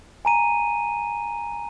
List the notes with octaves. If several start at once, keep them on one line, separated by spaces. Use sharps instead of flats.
G#5 A#5 D#7